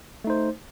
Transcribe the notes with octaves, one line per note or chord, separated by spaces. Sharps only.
A3 D#4 C5